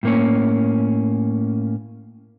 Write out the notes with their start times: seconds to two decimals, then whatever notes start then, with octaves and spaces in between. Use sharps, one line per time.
0.03 A2 A#3 C#4